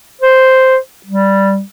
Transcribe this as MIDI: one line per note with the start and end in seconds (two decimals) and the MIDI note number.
0.21 0.76 72
1.06 1.61 55